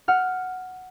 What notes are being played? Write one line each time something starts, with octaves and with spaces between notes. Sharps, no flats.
F#5 F6